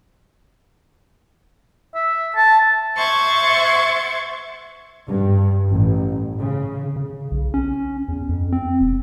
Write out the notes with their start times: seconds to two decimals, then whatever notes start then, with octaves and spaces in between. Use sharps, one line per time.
1.95 E5
2.36 A5
2.96 C5 E5 F#5 C#6 G#6 A6
5.08 G2
5.71 A1
6.38 C#3
6.96 C#3
7.32 B1
7.54 C#4
8.08 E2
8.29 F2
8.52 C4
8.81 E1